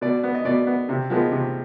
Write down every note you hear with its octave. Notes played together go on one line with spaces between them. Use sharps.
B2 D5
B3
D#5
B2 D5
B3
C3
F3 G#3 B3
C3